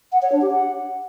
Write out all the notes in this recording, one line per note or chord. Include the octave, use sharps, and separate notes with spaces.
F#5
C#5
D4
G4
F#5